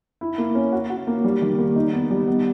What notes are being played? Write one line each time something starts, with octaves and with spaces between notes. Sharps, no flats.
E4
A#3
C#4
F#4
F#4
A#3
G3
D#3
A#3
D#4
B3
G3
B3